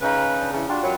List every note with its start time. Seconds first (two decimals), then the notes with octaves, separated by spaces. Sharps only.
0.02 C#3 C#4 D#4 G#4 B4 F5
0.15 G#4 G5
0.40 D4
0.53 C#3 E3
0.69 G3 D4 F4 F#4
0.83 F#2 F#3 B4 C#5